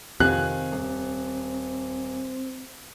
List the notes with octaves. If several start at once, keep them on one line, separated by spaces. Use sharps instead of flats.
F2 C3 D#3 C4 F5 G#5 F#6
D#1